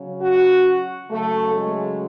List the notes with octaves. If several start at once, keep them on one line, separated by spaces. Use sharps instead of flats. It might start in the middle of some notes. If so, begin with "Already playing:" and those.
Already playing: C#3 F#3
F#4
C#3 F#3 A3
G#3